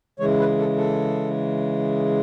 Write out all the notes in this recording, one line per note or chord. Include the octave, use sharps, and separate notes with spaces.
C#3 E3 G#3 C#5
B4
A4
A4